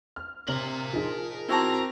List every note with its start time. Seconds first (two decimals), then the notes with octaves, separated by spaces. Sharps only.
0.16 F6
0.48 C3 A#4 C6 F#7
0.93 F3 D#4 G#4
1.49 C4 E4 F#4 A5 A#5